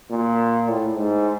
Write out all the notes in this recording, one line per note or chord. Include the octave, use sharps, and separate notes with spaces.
A#2
A2
G#2